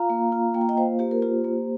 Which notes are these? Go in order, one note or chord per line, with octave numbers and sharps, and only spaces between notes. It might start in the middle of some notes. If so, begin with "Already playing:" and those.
Already playing: F4 F5 A#5
A#3
F4
A#3 G5
A#5
D#5 G5
F4 C5 F5
A#3 G4 C5
A#4
F4 G4 C5
A#3